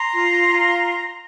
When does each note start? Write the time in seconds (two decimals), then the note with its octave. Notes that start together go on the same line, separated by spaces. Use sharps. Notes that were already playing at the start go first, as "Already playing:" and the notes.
Already playing: A#5 C6
0.13 F4
0.48 F4